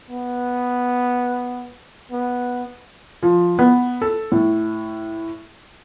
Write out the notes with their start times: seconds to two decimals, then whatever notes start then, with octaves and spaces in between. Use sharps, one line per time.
0.11 B3
2.12 B3
3.23 F3
3.59 B3
4.02 A4
4.32 A2